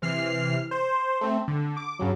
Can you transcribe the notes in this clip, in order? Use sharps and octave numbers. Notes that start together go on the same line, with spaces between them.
C3 E3 F6 C7
C5
A3 C4
D3
D6
G2 C#3 F#3